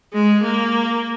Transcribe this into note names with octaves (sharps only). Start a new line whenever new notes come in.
G#3
A#3